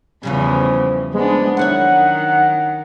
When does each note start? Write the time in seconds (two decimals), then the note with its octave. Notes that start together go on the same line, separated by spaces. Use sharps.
0.23 E2 C#3 E3 F3 G3
1.14 G#3 B3 D4
1.57 F#2 D#3 E4 C#5 F#5